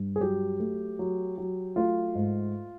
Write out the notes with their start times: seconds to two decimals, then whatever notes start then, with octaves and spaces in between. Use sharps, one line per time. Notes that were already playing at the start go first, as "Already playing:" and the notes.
Already playing: G2
0.16 G#4
0.20 F#3 G4
0.60 A3
0.99 F#3
1.38 F#3
1.76 A3 F4
2.15 G#2